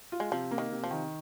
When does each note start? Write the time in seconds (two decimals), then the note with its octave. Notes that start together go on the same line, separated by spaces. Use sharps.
0.12 F4
0.20 G#3
0.32 C3 F3
0.51 A#3
0.58 D#3
0.71 C3
0.84 F3
0.91 D#3